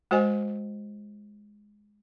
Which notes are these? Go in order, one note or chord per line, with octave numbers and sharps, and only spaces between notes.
G#3 F#4 C5 D#5 G#5